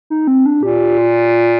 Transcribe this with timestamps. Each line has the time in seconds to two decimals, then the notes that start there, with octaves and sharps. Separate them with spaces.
0.10 D#4
0.27 C4
0.46 D4
0.63 A#2 G4
0.98 F4